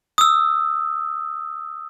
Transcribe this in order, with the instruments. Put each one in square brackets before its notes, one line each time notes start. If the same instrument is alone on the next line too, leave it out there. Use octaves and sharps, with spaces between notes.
[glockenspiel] D#6 E6